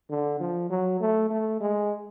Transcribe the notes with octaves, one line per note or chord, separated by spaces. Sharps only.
D3
F3
F#3
A3
A3
G#3